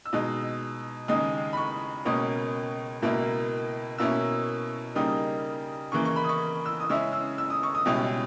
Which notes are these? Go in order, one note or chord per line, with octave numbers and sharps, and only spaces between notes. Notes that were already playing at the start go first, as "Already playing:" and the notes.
E6
B2 G#3 D#4 D#6
D#2 C#3 G#3 D#4 D#6
B5
C#6
C#2 B2 A#3 C#4 D#6
C#2 B2 A#3 E4
B2 A#3 C#4 E4 E6
C#3 G3 A#3 D#4 D#6
C#3 E3 A#3 C#6
C#6
B5
D#6
C#6
E6
D#6
C#3 G#3 C#4 E4 E6
E6
E6
D#6
C#6
D#6
C#2 B2 G3 C#4 E4